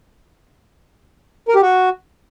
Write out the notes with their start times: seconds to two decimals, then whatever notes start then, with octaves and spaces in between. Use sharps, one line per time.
1.48 A#4
1.55 G4
1.62 F#4